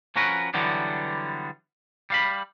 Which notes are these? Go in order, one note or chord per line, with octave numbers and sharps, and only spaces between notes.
F3 C#4 F#4 A#4 B4
D3 E3 F#3 G3 B3
G3 F5 B5